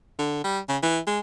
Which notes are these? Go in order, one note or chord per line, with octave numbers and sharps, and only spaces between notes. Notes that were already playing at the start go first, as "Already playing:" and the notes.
D3
G3
C#3
E3
G#3